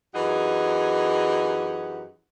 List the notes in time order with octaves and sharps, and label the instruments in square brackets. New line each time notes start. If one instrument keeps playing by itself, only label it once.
[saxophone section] F#2 E3 D#4 G4 G#4 F#5